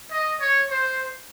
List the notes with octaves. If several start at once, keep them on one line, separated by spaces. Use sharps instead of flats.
D#5
C#5
C5